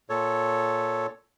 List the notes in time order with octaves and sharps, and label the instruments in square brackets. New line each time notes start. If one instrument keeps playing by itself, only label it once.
[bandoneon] A#2 A4 C#5